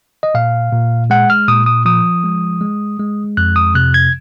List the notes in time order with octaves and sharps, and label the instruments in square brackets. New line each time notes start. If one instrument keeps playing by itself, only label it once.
[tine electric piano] D#5
A#2 F5
A#2
G#3 F#5
F6
A#2 D#6
D#6
F3 D#6
G#3
G#3
G#3
F2 F#6
D#6
C3 F#6
G#6